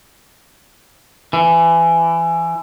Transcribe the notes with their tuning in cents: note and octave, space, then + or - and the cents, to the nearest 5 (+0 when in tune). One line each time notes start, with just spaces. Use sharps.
E3 +20